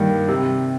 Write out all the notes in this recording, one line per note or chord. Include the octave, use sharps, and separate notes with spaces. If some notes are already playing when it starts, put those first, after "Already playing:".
Already playing: G2 D#3 A#3
C3